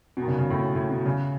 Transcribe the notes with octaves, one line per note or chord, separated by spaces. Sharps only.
B2
D#3
C#3
C#3
A2
B2
A2
B2
C#3